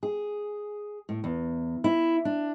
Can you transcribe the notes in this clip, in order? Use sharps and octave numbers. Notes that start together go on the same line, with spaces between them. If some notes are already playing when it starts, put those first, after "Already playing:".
G#4
A2
E2
E4
D4